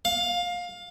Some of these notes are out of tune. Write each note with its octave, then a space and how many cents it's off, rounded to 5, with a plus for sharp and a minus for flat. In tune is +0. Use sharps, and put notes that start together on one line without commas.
F5 +20